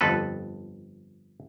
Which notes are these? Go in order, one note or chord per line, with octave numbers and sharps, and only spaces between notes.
G1 F2 A4 B4